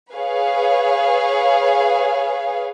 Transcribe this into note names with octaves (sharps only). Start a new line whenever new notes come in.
G#4 B4 C#5 F5